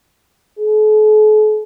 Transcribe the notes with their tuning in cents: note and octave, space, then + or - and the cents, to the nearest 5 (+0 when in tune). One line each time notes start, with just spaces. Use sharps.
A4 -45